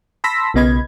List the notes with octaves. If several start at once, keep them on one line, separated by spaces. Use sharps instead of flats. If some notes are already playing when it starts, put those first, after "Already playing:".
A5 B5 C6 E6 A#6 B6
B1 C#3 B3 D#5 B5 G#6